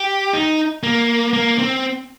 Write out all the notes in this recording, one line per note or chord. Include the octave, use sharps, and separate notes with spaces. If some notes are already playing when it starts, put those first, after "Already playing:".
Already playing: G4
D#4
A#3
A#3
C4